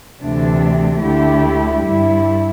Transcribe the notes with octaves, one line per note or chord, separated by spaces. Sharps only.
D2 C3 E3 A3 D4
D2 D3 A3 E4 G4
G2 G3 E4